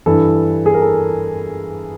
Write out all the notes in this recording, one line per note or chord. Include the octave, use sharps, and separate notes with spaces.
G2 E3 A4
G#4
A#4
A4